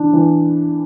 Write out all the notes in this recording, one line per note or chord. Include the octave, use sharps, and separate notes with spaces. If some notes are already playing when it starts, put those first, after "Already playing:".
Already playing: E3 D4
E3